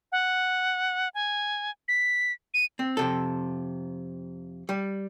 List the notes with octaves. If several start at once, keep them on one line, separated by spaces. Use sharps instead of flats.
F#5
G#5
B6
D#7
C4
F2 C3 A4
G3